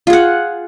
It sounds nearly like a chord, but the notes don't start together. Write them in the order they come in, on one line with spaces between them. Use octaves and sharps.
F4 G#4 F#5